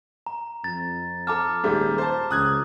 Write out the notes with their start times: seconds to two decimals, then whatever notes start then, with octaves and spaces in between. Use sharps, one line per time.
0.27 A#5
0.64 F2 A6
1.27 A4 A5 A#5 D6 F6
1.64 D#1 G#2 G3 A3
1.98 C5 A5
2.31 C#2 D#6 F#6 G#6